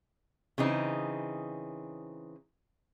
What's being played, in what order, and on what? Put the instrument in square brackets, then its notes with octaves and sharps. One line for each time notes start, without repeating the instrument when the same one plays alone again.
[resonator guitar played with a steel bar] C#3 E3 C4 D#4